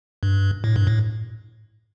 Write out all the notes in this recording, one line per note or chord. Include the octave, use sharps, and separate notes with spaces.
G2
A2
G2
A2